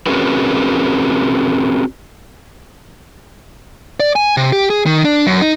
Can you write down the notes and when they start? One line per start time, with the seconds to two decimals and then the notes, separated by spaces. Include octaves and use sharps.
0.06 C4 C#4 F#4 G#4 A#4 B4
4.00 D5
4.16 G#5
4.37 C3
4.52 G4
4.70 G#4
4.86 D#3
5.05 D4
5.27 F#2
5.41 D#4